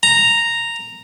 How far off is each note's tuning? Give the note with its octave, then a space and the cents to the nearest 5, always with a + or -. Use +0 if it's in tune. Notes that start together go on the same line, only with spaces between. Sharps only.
A#5 -5